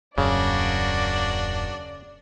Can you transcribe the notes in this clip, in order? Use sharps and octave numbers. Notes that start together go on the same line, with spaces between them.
D#1 F#2 C#3 A#3 D4 F#4 D5